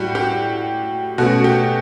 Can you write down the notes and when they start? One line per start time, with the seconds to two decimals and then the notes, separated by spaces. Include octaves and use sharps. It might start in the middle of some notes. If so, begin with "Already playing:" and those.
Already playing: A2 G3 F#4 G4
0.15 G4
1.18 B2 A3 C#4 F#4
1.44 G4